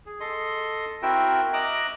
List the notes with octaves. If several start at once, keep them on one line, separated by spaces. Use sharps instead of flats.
G#4
A4 D#5 C6
C4 E4 F#4 A#4 E5 G5
D#5 E5 A#5 D6 F#6